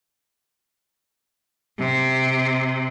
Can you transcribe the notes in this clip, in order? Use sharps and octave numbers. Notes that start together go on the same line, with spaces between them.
C3